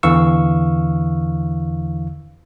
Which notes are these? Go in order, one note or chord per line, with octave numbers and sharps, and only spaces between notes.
E2 D3 E3 F5 C#6 E6